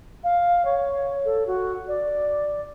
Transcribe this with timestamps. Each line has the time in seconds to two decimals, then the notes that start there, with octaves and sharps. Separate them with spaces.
0.24 F5
0.65 C#5
1.25 A4
1.47 F#4
1.88 D5